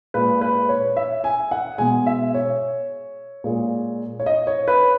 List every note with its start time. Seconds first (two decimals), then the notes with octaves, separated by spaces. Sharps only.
0.14 A#2 G#3 B4
0.41 B4
0.69 C#5
0.96 E5
1.24 G#5
1.51 F#5
1.78 B2 G#3 G#5
2.06 E5
2.34 C#5
3.44 A#2 G#3
4.19 C#5
4.26 D#5
4.47 C#5
4.68 B4